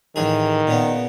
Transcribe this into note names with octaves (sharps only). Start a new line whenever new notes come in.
A1 D#3 E3 G#4
A#2 C#3 B3